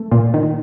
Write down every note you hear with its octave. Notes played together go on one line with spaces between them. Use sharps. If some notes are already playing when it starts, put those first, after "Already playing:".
Already playing: A3
A#2
D#3